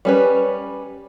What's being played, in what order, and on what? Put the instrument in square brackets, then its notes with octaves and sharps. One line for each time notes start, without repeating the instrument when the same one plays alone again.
[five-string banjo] G3 C#4 B4